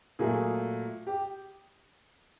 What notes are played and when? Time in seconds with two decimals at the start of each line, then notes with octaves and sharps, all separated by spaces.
0.19 A#2 F#3 A3 G#4
1.07 G4